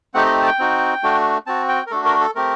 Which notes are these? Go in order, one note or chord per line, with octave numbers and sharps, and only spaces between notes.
A3 C4 D#4 G4 F#5
D#5
A5
G5
C4 D#4 F#4
A3 D4 F#4
C4 F#4 A5
G5
A#4
A3 D4 F#4 A4
A#4
A4
A3 C4 G4 A#4